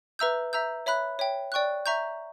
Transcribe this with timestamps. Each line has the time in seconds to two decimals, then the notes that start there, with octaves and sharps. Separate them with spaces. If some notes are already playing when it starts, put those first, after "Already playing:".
0.19 B4 E5 A#5 E6 G6
0.53 E5 A#5 E6 G6
0.86 C#5 E5 B5 F#6
1.19 C#5 E5 G5
1.52 D5 G5 C#6 F#6
1.86 E5 A#5 C#6 G6